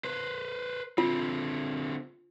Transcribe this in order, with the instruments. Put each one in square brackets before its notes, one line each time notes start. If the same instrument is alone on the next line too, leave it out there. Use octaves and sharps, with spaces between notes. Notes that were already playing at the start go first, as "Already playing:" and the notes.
[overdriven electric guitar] B4 C5
[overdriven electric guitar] D3 C4 [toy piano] F4